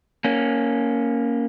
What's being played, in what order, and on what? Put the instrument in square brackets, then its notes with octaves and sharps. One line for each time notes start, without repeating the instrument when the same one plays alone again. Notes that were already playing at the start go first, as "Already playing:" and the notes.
[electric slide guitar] A#3 C#4